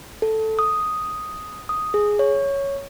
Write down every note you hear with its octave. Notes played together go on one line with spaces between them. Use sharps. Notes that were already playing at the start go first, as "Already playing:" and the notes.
A4
D#6
D#6
G#4
C#5